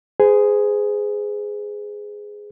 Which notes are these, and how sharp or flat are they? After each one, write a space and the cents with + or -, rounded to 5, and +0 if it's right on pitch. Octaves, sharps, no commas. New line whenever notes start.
G#4 +0 C5 -40